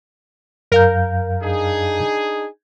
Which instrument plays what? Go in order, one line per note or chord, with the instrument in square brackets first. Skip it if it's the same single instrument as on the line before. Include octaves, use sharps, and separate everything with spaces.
[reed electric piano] F#2 F5 G6 [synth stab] A#4
[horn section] D4 D#4 G#4